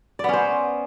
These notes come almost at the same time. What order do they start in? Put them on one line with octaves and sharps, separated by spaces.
D5 B3 C#4 C5